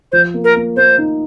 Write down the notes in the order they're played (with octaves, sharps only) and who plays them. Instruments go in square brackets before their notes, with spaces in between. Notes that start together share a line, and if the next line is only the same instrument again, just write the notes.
[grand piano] F3 [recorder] C5
[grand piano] A#3
[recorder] A#4
[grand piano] A#3
[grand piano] A#3 [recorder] C5
[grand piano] D#4